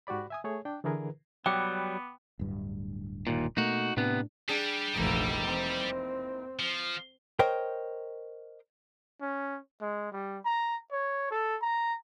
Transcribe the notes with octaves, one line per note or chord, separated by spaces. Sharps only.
G#2 F#4 G4 D5 B5
E5 G#5 D#6
A3 G#4 C#5
D4 G5
D3 E3 E4 G#4 A#4 B4
F#3 G3 B3 G5 D6 F#6
D1 G2
D#2 A#2
B2 A3 A#3 D#4 F#4
A2 C3 B3 D4
G3 D4 G#4
F1 A#1 E3 A#3 D#4
C4
F3
A#4 C5 C#5 D#5 G5
C#4
G#3
G3
A#5
C#5
A4
A#5